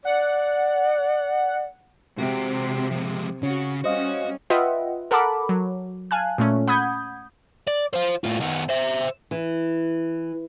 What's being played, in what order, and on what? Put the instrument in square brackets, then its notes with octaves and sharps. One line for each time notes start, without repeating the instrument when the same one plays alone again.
[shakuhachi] D5 [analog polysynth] F#5
[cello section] C3 [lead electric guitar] G#3 F#4
[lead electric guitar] F3 G#3
[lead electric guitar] C#3 [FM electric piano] C#4 [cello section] F#4
[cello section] G3 C#4 [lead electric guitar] F#4 [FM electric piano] C5 D#5 F5
[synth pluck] F4 B4 D#5 E5 F#5 G5
A4 A#4 F#5 A5 B5 D6
F#3
F5 G#5 A5 F#6
A#2 A3 C#4
F#5 B5 D#6 G6 G#6
[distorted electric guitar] D5
F4 C5
A2 F4
D#3 B3
C5 E5
[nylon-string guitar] E3